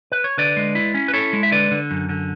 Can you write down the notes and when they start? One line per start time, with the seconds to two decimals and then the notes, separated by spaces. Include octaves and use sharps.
0.12 B4
0.24 C#5
0.38 D3 B4 D5
0.57 G#3
0.75 E4
0.94 C#4
1.08 B4
1.14 E4 A4 C#5
1.33 G#3
1.43 E5
1.52 D3 B4 D5
1.71 D3
1.91 F#2
2.09 D3